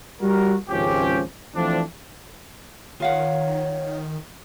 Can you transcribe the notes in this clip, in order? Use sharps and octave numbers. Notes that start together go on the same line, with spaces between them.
G3 F#4 A#4
G#1 C#2 F3 C#4 G4
E3 F3 A3 C4 D4
D#3 F4 C#5 F5 F#5